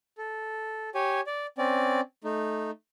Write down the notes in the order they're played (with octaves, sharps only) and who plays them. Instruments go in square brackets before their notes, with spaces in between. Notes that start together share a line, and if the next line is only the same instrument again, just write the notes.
[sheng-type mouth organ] A4
G4 C#5 G#5
D5
C4 C#4 D5
A3 D#4